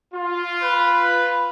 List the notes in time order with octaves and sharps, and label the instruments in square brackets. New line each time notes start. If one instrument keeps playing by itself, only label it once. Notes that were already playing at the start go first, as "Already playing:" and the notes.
[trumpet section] F4
[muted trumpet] B4